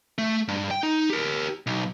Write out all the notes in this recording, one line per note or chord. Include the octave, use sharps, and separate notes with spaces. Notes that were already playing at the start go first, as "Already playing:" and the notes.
A3
G2
G5
D#4
G4 A#4
B1